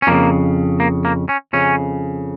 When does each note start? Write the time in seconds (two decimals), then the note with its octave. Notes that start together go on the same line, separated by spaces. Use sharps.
0.02 C#4
0.07 F2 C#3 A#3
0.80 A#3
1.05 A#3
1.29 C#4
1.53 F2 C#3 C#4